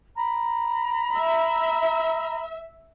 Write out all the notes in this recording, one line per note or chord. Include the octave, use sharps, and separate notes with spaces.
A#5 B5
E5